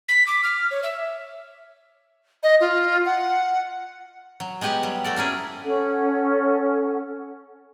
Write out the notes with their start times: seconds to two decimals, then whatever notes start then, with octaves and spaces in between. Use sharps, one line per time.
0.09 B6
0.27 D6
0.43 F6
0.71 C#5
0.83 E5
2.43 D#5
2.61 F4
3.05 F#5
4.40 F#3
4.61 G#3 B3 G4 B4 C#5 F#5
4.83 F#3 G3
5.04 A3 F#4 A4 D5
5.16 A#3 C#4 E4 G#4
5.64 C#4 A4 F#5